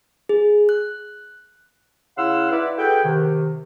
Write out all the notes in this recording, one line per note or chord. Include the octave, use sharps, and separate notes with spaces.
G#4
F#6
C#3 E4 F5 F#5 C6 E6
E4 B4 D5
F#4 G#4 A4 B4 G5
C3 D#3